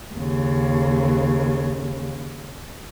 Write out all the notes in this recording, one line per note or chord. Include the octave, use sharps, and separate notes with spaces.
D#2 C#3